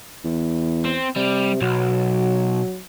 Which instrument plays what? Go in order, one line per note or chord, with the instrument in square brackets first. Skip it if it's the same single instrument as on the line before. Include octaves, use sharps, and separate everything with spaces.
[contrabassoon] E2
[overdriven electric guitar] C4
[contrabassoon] C3 [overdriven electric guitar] G3
[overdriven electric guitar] B1 [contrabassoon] F#3